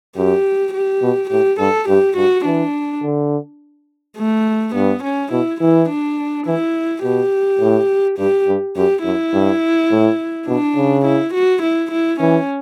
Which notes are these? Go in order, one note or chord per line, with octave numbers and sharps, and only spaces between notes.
F#2 G4
G4
B2
A2 G4
G2 A4
G2 G4
G2 F#4
E3 D4
D3
A3
G2 B3
C#4
B2 E4
E3 E4
D4
E3 E4
B2 G4
A2
G2 G4
G2
F#2 G4
F#2 E4
G2
A2
B2 D4
C#3
E4
F#4
E4
E4
E3 C#4